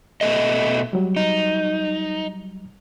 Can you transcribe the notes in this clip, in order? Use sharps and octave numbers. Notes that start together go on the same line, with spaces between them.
B2 A3 D#5
F#3 G3
D#4